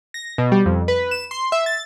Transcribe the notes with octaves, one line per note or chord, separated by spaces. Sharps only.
A#6
B2
G3
F2
B4
E7
C6
E5
A6